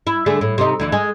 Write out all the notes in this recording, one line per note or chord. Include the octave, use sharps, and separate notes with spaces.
E4
D3 A3 G#4
A2
C3 C4 D#4
D2 E3 E4
G#3 G#4